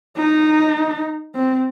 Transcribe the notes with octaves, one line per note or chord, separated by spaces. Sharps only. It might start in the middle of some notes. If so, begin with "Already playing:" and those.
D#4
C4